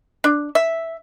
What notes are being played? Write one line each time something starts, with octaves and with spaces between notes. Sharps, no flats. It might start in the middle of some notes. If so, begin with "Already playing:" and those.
D4
E5